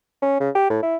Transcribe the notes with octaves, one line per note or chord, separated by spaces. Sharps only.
C#4
C#3
G4
A2
E4